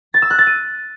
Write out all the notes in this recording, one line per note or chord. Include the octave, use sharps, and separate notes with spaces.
A6
E6
F#6
A6
D#7